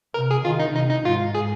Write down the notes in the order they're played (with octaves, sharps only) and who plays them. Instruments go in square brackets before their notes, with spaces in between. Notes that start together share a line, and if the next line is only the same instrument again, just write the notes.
[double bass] C3 [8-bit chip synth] A#4
[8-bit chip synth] G#4
[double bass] D#3 [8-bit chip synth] F4
[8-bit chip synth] D#4
[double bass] C3 [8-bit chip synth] D#4
[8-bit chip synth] D#4
[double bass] G#2 [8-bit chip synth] F4
[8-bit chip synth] G#4